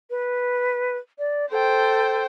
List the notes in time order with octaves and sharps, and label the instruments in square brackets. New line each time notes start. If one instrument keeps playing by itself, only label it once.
[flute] B4
D5
[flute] A4 [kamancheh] C5 G5